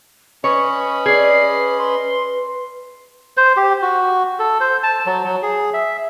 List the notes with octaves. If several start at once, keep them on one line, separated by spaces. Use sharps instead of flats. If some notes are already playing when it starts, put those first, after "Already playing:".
C#4 B4 C#5 D#5 B5
G#4 D5 C7
C6
C5
G4
F#4
A4
C5
A5
F#3
F#3
G#4
E5